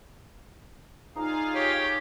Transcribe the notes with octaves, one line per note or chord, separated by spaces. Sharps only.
D#4 F4 G#4 D5 F5 A#5
G4 C#5